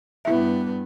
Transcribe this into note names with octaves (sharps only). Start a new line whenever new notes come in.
G2 B3 E4 E5